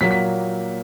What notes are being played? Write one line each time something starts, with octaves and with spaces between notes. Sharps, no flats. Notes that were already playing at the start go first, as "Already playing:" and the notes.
A#2 F#3 A#3 B6
B6